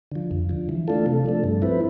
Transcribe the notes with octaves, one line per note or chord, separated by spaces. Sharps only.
D3 F3
F2
D3 F3
E3
A3 D4 F4 A4
C3
F3 A3 D4 A4
G2
F3 C4 E4 B4